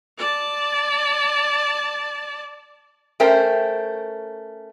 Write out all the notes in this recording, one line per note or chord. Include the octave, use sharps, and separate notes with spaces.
D5 A5
A3 C#4 A#4 C5 G5